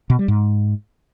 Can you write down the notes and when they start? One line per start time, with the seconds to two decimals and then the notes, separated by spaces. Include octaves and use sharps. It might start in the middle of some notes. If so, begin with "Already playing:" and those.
0.10 B2
0.19 G3
0.28 G#2